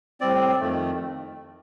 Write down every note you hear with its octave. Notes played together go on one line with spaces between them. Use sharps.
A2 G3 C4 D5
F2 D#3 A3